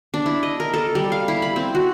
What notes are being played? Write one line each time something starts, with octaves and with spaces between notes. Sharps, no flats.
D4
E4
D#5
A#4
A4
G3
F5
E4
B5
C4
F#4